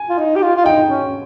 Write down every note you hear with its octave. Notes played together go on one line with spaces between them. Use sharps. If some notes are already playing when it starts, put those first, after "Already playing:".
Already playing: G#5
F4
D#4
G4
F4
F4
D#4 G5
C#4